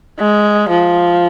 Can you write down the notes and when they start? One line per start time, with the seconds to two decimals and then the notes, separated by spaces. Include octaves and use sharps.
0.19 G#3
0.69 F3